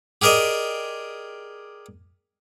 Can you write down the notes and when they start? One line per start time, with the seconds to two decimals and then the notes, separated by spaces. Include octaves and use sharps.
0.22 G4 G#4 A#4 D5 D#5